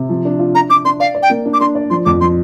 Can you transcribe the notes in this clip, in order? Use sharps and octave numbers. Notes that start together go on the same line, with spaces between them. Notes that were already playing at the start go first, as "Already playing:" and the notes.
Already playing: C3
F3
D4
F4
D4 A#5
D4 D6
D4 C6
D5 F5
D5
G5
A#3
D4
D6
D4 C6
D5
F3 C6
F2 D6
F3 C6